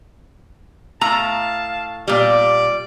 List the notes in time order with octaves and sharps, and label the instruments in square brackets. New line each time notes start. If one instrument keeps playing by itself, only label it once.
[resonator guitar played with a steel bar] A2 A#5 [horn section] F5 A5
[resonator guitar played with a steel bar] A#2 G3 [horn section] D5